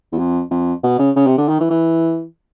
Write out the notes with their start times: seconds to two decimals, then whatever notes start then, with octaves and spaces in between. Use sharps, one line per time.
0.12 E2
0.18 F2
0.51 F2
0.83 B2
0.99 C#3
1.16 C#3
1.27 C3
1.38 D3
1.48 D#3
1.60 E3
1.70 E3